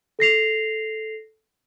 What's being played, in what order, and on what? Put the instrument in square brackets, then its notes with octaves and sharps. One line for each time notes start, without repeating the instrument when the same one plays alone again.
[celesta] A4 A#6 C7 F7